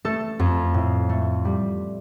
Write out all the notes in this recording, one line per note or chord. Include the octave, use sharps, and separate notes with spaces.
A3 A4
F2
A2
A3
G3